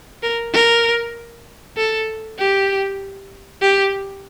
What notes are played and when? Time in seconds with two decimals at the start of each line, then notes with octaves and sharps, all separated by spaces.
0.23 A#4
0.53 A#4
1.77 A4
2.38 G4
3.62 G4